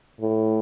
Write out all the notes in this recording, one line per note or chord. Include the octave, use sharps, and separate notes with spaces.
A2